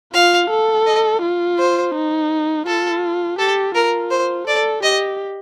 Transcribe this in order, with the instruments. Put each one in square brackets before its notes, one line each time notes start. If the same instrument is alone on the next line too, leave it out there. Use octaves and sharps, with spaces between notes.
[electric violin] F4 [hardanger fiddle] F5
[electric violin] A4
[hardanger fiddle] D#5
[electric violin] F4
[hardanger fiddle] C5
[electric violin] D#4
[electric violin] F4 [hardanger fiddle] A4
[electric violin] G4 [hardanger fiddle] A4
[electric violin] F4 [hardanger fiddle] A#4
[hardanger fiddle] C5
[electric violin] A4 [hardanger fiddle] D5
[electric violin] G4 [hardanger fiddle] D#5